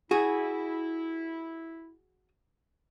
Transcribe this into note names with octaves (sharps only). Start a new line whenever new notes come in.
E4 F#4 G#4